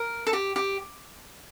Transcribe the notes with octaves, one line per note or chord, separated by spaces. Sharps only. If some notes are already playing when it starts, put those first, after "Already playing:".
Already playing: A#4
A4
G4
G4